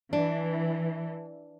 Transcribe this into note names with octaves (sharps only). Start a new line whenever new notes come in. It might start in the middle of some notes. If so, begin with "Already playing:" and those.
E3 D4